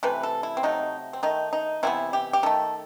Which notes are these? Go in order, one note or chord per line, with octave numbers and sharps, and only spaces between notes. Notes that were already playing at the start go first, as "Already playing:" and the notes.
C3 E3 A3 B4
A4
E4
C4
C3 F#3 A3 D#4
C4
D#3 A3 D#4
D#4
C3 E3 B3 E4
G4
G4
D#3 A3 A4